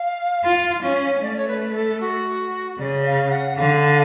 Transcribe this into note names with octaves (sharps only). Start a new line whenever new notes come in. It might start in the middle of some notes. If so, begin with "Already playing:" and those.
Already playing: F5
F4
C#4
A3 D5
C#5
B4
A4
F#4
C#3 D5
F5
F#5
F#5
D3 F5